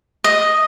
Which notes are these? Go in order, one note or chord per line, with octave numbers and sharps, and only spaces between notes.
D#5